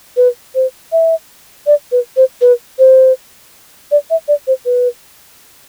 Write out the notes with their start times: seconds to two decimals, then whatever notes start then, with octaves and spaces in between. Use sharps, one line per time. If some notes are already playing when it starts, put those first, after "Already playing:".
0.17 B4
0.55 C5
0.92 E5
1.66 D5
1.92 B4
2.17 C5
2.41 B4
2.79 C5
3.91 D5
4.10 E5
4.28 D5
4.47 C5
4.65 B4